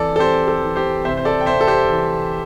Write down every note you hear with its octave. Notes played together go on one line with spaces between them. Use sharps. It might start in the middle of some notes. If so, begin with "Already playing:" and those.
Already playing: E3 C4 A4 D5
A4
C4 G4 C5
A4
E3
G4 C5
C3 C5 E5
C5
A4 D5
G5
C3 C5 E5
A4
G4 C5
E3